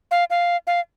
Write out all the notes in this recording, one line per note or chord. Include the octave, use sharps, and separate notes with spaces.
F5
F5
F5